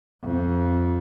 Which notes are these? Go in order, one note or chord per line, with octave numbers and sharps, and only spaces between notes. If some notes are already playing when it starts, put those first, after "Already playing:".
F2